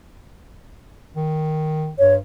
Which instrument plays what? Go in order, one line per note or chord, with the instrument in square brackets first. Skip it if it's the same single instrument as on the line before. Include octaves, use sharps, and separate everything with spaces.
[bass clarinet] D#3
[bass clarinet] G2 [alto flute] C#5